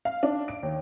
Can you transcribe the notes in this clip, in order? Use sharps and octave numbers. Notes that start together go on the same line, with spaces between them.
F5
D4
D7
D#2